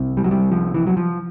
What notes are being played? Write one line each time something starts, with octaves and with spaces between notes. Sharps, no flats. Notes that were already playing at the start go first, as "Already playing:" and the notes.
Already playing: C2 C3
G3
F#3
G3
F3
E3
F#3
F3